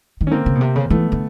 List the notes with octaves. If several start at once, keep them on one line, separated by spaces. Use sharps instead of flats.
D#3
C#4
D3 A#3 C4
C#3
B2
C3
C#3
E3 A3 B3
D3